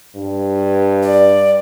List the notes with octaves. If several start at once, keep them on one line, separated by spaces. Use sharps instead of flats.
G2
D5